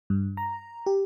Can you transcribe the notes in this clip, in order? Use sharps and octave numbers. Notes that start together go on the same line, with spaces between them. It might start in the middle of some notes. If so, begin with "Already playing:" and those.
G2
A#5
G4